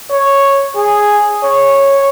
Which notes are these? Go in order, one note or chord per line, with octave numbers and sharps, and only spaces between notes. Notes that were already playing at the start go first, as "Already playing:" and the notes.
C#5
G#4
C#5